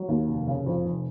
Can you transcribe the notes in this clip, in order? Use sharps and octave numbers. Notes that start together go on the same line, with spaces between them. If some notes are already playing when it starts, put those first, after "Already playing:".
Already playing: F#3
D#2
F1
C#3
F2
F1